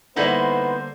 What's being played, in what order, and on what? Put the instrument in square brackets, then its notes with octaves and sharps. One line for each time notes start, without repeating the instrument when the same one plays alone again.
[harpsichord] D3 G3 A#3 [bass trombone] B3 [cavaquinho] D#4 E4 [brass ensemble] C5